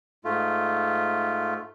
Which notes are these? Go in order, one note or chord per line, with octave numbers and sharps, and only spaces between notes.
G#2 A3 F4